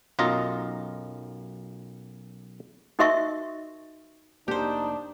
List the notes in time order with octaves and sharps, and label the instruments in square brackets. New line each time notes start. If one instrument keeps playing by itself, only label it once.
[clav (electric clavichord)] B1 F#2 F4 D#5 A#5
[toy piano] D#4 F#4 A#4 D#5 E5 C#6
[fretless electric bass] F1 A#3 [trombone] D4 [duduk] D#4 [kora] G4 C5